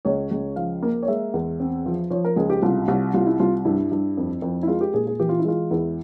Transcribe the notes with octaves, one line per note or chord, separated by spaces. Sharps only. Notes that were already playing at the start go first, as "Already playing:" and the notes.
C#2 C#5
C#2
F3 F5
A#3
C#5
G#3 E5
E2
C4
F3
F3 C#5
A#4
C#2 G#4
G4
C2 F4
C2
C2 F4
E4
C2 F4
G2 E4
G2
F2
F2
E4
G#3 F4
G4
A#2 G#4
G#4
E3 G4
F4
E4
G#3 F4
E2 E4